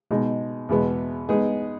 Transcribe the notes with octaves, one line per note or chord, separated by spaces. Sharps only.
B2 G#3 D#4
E2 B2 G#3 B3
G#3 B3 D#4 G#4